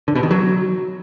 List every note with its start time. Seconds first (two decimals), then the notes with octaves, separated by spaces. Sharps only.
0.08 D3
0.15 B2
0.23 D#3
0.31 F#3